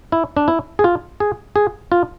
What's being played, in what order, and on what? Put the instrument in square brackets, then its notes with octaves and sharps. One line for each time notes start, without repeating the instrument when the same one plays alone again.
[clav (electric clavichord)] E4
D4
E4
G#4
F4
G#4
G#4
F4